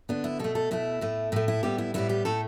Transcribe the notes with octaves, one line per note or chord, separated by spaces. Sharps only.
D3 B3 D4
E4
B2 A3 A4
A4
B2 A3 E4
A2 A3
A2 A3 E4
E4
A2 G3 B3 G4
E4
A2 G3 B3 E4
G4
A2 A3 A4